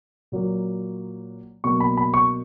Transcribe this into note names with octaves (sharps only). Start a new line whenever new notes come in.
A#2 F#3 A#3
B2 F#3 A#3 C#6
B5
B5
C#6